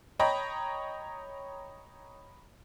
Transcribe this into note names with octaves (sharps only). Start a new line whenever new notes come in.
C#5 D#5 G5 A#5 B5